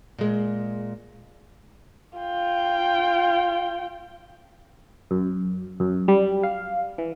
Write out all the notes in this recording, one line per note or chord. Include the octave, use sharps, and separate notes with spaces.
A#2 G#3
F4 G5
F#2
F#2
G3
F5
E3